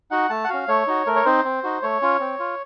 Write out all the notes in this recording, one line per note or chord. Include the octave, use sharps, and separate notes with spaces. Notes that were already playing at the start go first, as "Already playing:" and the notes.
D#4 F#4 F#5
A3 A5
F#5
C#4 F#4 F5
A3 C#5
D#4 F#4
A3 A#4
C#5
C4 D#4 C5
C4
D#4 F#4
A3 C#5
C#4 F4
C4
F4